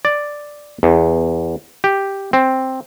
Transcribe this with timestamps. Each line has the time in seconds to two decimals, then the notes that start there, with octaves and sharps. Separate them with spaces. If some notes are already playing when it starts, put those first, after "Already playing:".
0.05 D5
0.83 E2
1.84 G4
2.33 C4